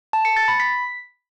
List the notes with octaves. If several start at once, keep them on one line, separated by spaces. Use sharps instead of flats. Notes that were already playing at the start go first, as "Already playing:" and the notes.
A5
C#7
A6
B5
B6